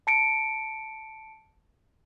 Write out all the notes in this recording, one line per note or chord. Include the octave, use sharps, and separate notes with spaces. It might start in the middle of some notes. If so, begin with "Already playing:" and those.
A5 C#7 D7